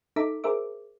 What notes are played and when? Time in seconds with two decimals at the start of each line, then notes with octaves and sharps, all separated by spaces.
0.16 D#4 A4 E5 A#5 D6 B6
0.44 G#4 A#4 C5 E5 D6